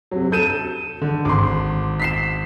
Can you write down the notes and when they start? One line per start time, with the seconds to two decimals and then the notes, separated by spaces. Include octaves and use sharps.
0.11 C3 F#3
0.32 A4 G6 D#7 E7
1.02 D3
1.25 G#1 C6 D6
2.00 B6 C7 E7